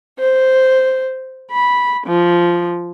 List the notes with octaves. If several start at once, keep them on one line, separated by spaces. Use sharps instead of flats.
C5
B5
F3